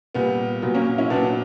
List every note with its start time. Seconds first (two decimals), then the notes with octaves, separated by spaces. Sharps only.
0.14 A#2 G3 B3
0.62 A#2 F#3 B3
0.74 A#3 C#4
0.98 C#4 E4
1.10 A#2 F#3 B3 D4